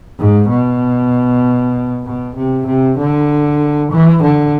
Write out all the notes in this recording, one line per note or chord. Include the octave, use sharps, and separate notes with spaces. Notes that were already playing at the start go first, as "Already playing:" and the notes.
G#2
B2
B2
C3
C3
D3
E3
D3